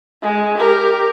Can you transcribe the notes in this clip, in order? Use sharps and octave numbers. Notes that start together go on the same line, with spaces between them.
G#3
G4 A#4